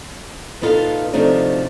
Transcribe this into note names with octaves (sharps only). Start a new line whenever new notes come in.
A#2 B3 D#4 F4 A4 F5
D2 C3 F3 A3 D4 D#4